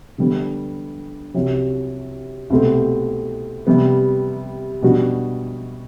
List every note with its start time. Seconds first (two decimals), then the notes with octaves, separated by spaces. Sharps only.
0.18 D3 G3 B3
1.34 C2 C3 F#3
2.50 C2 B2 A3 C4
3.67 C3 G3 B3
4.83 B2 G3 D4 F#4